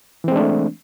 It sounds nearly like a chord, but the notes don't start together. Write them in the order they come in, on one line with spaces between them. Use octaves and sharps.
E3 C4 G#3 D4 A3